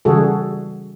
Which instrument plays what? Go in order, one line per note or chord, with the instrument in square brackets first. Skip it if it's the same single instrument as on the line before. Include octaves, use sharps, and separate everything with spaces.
[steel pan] C#3 E3 G3 F#4 G#4 A4